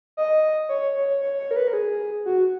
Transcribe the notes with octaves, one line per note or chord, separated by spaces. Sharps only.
D#5
C#5
C#5
C#5
C#5
A#4
B4
A#4
G#4
F#4